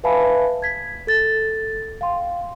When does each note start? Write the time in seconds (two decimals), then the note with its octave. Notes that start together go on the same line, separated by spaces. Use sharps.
0.04 B4 E5 F5 G#5 A5 B5
0.62 G#6 B6
1.07 A4 A6
2.01 F5 G5 C6